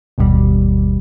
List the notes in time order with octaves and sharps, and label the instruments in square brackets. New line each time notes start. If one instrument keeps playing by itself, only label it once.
[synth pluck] G1 D#2 B2 G3